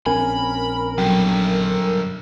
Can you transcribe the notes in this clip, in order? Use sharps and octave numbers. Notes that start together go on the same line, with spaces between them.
A#1 C4 C#4 A#4 G#5 B5
G2 B2 D3 F#3 G5